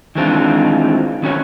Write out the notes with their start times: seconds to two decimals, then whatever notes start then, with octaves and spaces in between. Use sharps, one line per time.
0.15 D#3 E3 G#3 C4 D4 F4
1.22 D#3 C#4 F#4 C#5